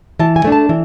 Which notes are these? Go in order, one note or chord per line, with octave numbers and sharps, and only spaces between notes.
E3 A5
G#5
A3 D4
A5
E3